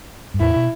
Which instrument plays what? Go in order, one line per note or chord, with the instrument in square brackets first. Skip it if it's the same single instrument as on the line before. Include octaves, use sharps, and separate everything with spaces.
[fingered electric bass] G2
[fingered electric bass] E2 A2 [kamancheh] E4
[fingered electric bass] B2